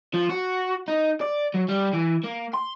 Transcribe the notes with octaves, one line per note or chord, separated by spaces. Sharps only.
F3
F#4
D#4
D5
F#3
G3
E3
A#3
C6